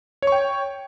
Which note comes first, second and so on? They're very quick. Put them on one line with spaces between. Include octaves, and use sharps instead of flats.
C#5 C#6 G5